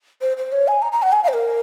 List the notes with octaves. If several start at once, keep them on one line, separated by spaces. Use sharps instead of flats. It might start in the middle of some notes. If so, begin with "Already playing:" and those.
C5
C5
C#5
G#5
A#5
A#5
F#5
G#5
F5
C5
A#4